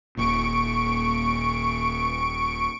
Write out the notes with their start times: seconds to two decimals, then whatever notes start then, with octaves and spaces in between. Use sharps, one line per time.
0.17 D#1 A#2 C#6 D7